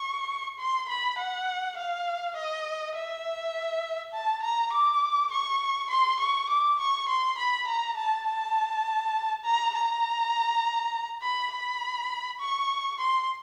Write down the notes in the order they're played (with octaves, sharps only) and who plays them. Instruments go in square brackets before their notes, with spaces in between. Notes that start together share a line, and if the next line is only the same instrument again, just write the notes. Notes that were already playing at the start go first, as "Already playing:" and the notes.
Already playing: [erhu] C#6
C6
B5
F#5
F5
D#5
E5
A5
A#5
D6
C#6
C6
C#6
D6
C#6
C6
B5
A#5
A5
A5
A#5
A#5
B5
B5
C#6
C6